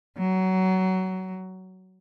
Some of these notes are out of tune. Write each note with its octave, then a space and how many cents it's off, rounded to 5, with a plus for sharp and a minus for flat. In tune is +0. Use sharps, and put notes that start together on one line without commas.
F#3 +20